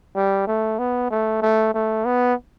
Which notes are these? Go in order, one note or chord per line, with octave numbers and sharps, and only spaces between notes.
G3
A3
B3
A3
A3
A3
B3